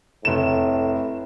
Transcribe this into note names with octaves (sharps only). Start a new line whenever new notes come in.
F1 A2 E7